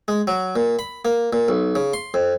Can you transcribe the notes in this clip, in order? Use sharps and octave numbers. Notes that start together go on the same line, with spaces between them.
G#3
F#3
A#2
B5
A#3
A#2
B1
C#3
C6
F2